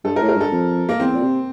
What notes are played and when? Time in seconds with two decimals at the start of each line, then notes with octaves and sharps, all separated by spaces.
0.04 G2 A4
0.16 A#4
0.21 A2
0.29 A#4
0.35 G2
0.41 A4
0.52 F2
0.89 A#3
0.99 E2 C4
1.15 A#2
1.22 C3